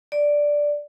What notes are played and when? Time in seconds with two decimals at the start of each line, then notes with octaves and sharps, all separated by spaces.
0.12 D5